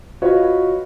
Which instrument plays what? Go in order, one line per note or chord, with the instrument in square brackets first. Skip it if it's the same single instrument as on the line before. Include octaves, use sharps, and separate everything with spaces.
[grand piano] F4 F#4 B4 C#5 D#5